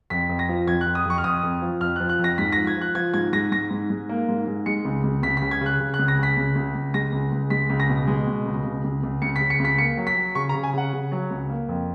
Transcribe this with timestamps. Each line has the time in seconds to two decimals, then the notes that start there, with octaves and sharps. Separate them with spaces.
0.10 F2 B6
0.29 F2
0.39 A#6
0.49 F3
0.67 F2 G#6
0.81 F#6
0.86 F2
0.95 D#6
1.06 F2 C#6
1.18 F6
1.24 F2 D#6
1.43 F2
1.62 F3
1.81 F2 F6
1.96 F#6
2.00 F3
2.09 F#6
2.19 F2 A#6
2.38 G#2 B6
2.52 A#6
2.57 F3
2.67 G#6
2.77 F3 F#6
2.95 F3 G#6
3.14 G#2 G#6
3.33 G#2 A#6
3.52 G#2 A#6
3.70 G#2
3.90 G#2
4.09 A#3
4.28 G#2
4.47 G#2
4.66 G#3 C#7
4.85 C#2
5.04 C#2
5.23 C#2 B6
5.37 B6
5.42 C#3
5.51 G#6
5.61 C#3 F#6
5.80 C#3
5.94 F#6
5.99 C#2
6.08 A#6
6.18 C#3 B6
6.37 C#2
6.55 C#2
6.75 C#2
6.94 G#3 A#6
7.12 C#2
7.32 C#2
7.50 G#3 B6
7.70 C#2
7.80 A#6
7.89 B2
8.07 G#3
8.27 B2
8.46 C#2
8.64 C#2
8.84 C#2
9.03 C#2
9.22 C#2 C#7
9.36 B6
9.41 C#3
9.50 C#7
9.59 C#2
9.65 B6
9.78 A#3 C#7
9.97 F#3
10.07 B6
10.16 F#3
10.35 C#3 C#6
10.49 A#5
10.55 C#3
10.63 G#5
10.73 C#3 F#5
10.93 C#3
11.12 F#3
11.30 C#2
11.49 A#3
11.69 F2